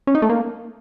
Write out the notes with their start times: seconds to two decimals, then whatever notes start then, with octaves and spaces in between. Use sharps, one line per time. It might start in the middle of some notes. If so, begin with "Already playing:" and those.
0.07 C#4
0.15 D#4
0.22 A3
0.30 A#3